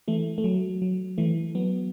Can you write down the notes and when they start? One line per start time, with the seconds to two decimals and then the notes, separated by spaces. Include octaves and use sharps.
0.08 E3 A3
0.38 A3
0.44 F#3
0.82 F#3
1.18 E3 A3
1.55 F#3 B3